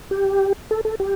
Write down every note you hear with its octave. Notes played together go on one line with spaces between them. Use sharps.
G4
A4
A4
G4